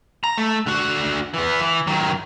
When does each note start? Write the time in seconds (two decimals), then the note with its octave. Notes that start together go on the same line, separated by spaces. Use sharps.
0.24 A#5
0.38 A3
0.66 D3 F#4
1.34 E3 B3
1.61 E3
1.87 D#3 F#3